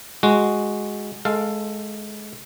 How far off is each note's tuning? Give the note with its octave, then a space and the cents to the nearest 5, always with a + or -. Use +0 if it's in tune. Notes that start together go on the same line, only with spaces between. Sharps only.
G#3 +0 F#4 +0
G#3 +25 A4 +10 F5 +0